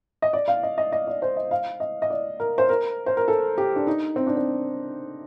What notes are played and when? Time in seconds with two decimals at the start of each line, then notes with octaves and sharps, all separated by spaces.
0.22 D#5
0.33 D5
0.48 F5
0.63 D#5
0.78 D#5
0.92 D#5
1.07 D5
1.22 C5
1.37 D#5
1.51 F5
1.80 D#5
2.02 D#5
2.10 D5
2.40 A#4
2.58 C5
2.69 A#4
3.06 C5
3.17 A#4
3.28 A4
3.58 G4
3.76 D4
3.87 D#4
4.16 C4
4.27 D4
4.37 C4